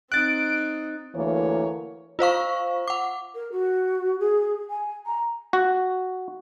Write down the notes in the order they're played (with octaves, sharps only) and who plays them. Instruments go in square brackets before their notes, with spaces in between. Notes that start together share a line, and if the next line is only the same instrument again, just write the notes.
[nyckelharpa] C4 D#4 [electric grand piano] F#6 A6 [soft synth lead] D7
[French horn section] D2 E3 A#3 A#4 C#5
[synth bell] F4 C5 F5 C#6
F#5 D6
[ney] A#4
F#4
G#4
G#5
A#5
[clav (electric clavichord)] F#4